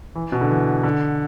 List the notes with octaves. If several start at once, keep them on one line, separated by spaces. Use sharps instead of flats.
E3
B2
D3
E3
D3